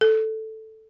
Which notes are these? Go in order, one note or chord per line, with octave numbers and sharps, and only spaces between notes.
A4